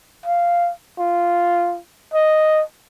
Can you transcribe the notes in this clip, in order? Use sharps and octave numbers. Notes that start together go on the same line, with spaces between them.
F5
F4
D#5